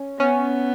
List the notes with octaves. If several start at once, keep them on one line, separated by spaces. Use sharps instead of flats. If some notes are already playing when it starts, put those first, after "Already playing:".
Already playing: C#4
B3 C#4